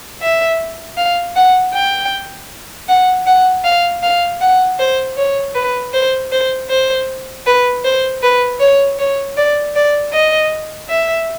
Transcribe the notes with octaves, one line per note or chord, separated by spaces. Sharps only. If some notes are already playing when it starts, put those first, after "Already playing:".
E5
F5
F#5
G5
F#5
F#5
F5
F5
F#5
C5
C#5
B4
C5
C5
C5
B4
C5
B4
C#5
C#5
D5
D5
D#5
E5